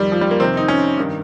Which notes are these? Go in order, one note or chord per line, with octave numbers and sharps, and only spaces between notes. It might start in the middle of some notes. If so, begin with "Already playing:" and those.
Already playing: F2 D#3 G3
F3
G3
A#3
F2 C3 D#3 C4
D#4
C#4
G2 D#3